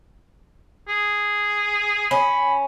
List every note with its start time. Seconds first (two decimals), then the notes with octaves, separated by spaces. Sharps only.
0.88 G#4
2.11 C#4 B5